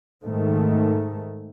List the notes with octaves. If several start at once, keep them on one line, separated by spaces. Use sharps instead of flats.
G#2 D#3 A3